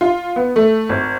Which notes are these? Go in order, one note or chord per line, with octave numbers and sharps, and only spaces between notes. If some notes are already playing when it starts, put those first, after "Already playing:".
F4
B3
A3
G#1